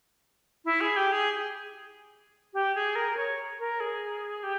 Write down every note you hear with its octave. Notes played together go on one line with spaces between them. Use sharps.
E4
G#4
G4
G#4
G4
G#4
A#4
C#5
A#4
G#4
G4